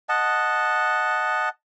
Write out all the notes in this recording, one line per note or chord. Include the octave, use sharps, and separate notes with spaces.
D#5 F#5 A5